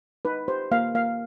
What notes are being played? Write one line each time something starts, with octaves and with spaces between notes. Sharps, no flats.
D#4 B4
G4 C5
A#3 F5
A#3 F5